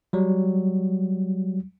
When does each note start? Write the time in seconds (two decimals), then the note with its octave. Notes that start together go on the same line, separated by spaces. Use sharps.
0.13 F#3 G3